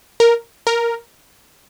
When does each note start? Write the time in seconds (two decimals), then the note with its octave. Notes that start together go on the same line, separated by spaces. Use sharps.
0.20 A#4
0.67 A#4